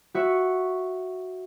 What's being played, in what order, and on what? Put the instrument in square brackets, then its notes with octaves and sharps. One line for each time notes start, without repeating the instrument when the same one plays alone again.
[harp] F#4 E5 C#6